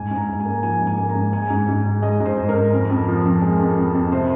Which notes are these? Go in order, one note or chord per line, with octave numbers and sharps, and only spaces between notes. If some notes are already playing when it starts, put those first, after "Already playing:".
Already playing: G#2 G#5
G#2
A#5
G#2
G#5
A#3
F3 G#5
G#2
G#5
A#3
A#5
G#2
G#3 G#5
G#2
G#2
G#3
G#3 D#5
G#2
C5
G#2
A#4
G#2
F2
F2
F3
F2
G#3
F2
F2
F2
C3 C5